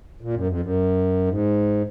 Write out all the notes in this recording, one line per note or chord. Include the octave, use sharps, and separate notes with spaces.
A#2
F#2
F2
F#2
G#2